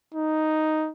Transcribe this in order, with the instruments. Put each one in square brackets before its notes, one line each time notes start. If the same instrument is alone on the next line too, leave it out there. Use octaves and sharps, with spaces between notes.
[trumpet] D#4